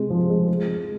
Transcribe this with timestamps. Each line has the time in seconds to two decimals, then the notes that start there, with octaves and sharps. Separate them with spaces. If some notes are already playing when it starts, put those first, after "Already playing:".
Already playing: C3 G#3
0.10 F3
0.30 G#3
0.48 G#3
0.67 G#3